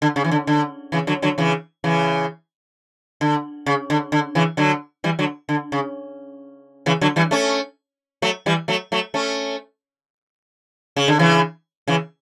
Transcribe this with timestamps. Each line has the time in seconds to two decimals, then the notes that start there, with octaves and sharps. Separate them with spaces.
0.02 D3
0.16 C#3
0.24 E3
0.31 D3
0.47 D3
0.92 C#3 E3
1.07 D3 F#3
1.22 D3 F#3
1.38 C#3 E3
1.84 C#3 E3
3.21 D3
3.66 C#3
3.90 D3
4.12 D3
4.35 C#3 E3
4.57 D3 F#3
5.04 E3 G3
5.19 D3 F#3
5.49 D3
5.72 C#3
6.86 C#3 E3
7.01 D3 F#3
7.16 E3 G3
7.31 A3 C#4
8.22 F#3 A3
8.46 E3 G3
8.68 F#3 A3
8.92 F#3 A3
9.14 A3 C#4
10.96 C#3
11.08 D3
11.19 C#3 E3
11.87 C#3 E3